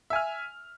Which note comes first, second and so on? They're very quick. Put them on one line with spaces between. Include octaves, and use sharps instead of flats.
E5 G#5 F6